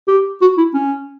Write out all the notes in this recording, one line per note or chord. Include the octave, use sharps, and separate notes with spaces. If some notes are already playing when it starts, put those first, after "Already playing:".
G4
F#4
E4
C#4